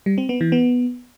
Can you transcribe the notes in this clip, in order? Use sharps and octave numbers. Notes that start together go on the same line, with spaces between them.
G3
C4
B3
E3
B3